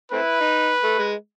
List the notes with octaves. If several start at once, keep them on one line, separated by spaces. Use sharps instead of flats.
A3 C4 E4 B4
D#4
A3
G#3